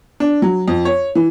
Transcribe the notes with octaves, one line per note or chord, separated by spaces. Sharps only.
D4
F#3
F2
C#5
E3